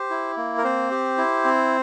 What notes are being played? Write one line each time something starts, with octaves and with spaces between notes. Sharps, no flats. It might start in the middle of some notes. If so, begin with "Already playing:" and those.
Already playing: G4 C5
E4
A#3
A#4
C4 C5
G4
E4
C4